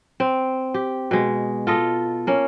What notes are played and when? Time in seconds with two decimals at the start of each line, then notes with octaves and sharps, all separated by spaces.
0.20 C4
0.74 G4
1.11 B2 G#3
1.67 F4 A4 D#5
2.27 A#3 C#4